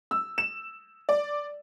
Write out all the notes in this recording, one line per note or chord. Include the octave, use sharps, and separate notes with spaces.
E6
E7
D5